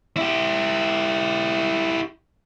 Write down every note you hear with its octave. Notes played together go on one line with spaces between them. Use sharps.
E4 G4